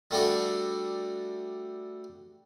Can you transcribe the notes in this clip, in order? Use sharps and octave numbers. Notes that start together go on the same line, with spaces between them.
G3 A3 D4 F#4